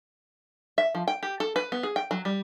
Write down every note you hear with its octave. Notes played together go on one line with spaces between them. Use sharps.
E5
F3
G5
G4
A4
B4
B3
G#4
G5
F#3
G3